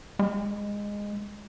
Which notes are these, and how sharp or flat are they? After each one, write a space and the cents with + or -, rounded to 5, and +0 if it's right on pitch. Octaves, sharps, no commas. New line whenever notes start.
G#3 -15